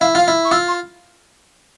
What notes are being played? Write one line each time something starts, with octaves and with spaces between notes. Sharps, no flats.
E4 F5
F4 F5
E4
C#6
F4 E6
C6